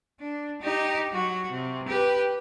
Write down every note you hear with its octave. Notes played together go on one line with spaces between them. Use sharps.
D4
D#4 G4
F#3 F#4
C3
G4 B4